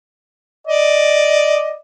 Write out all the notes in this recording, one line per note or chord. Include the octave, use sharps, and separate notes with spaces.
D5 D#5